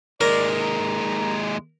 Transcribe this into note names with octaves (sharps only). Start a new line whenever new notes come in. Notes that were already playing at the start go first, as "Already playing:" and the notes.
D#2 G#3 A#4 D5
A#5